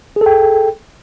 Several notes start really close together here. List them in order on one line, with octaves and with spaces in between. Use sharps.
G#4 A4 G5